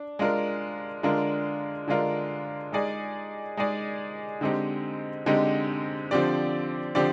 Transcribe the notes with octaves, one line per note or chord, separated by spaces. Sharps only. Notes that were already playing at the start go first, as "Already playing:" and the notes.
Already playing: D4
G#3 D4 F4 A#4
D3 G#3 D4 F4 A#4
D3 G#3 D4 F4 A#4
G#3 D#4 G#4 D5
G#3 D#4 G#4 D5
D3 G#3 C4 D#4 G4
D3 G#3 C4 D#4 G4
D3 F3 C4 G4 D5
D3 F3 C4 G4 D5